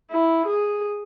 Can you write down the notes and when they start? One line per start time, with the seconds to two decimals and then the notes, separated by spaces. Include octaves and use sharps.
0.10 E4
0.46 G#4